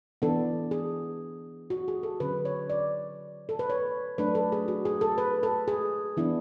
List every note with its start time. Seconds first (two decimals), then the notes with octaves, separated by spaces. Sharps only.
0.22 E3 B3 D4 A4
0.71 G#4
1.70 F#4
1.88 G#4
2.03 A4
2.20 D3 F#3 C#4 B4
2.45 C#5
2.70 D5
3.49 A4
3.59 B4
3.70 C#5
4.18 F#3 A3 D4 B4
4.35 A4
4.52 G#4
4.68 F#4
4.85 G#4
5.01 A4
5.18 B4
5.43 A4
5.68 G#4
6.17 E3 B3 D4 E4